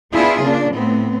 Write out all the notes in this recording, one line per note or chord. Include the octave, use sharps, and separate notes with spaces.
B3 D4 E4 F4 G#4
C#3 A#3 D4
A2 B3 C4